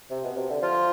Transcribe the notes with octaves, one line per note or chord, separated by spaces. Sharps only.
C3
B2
C3
D3
F3 F4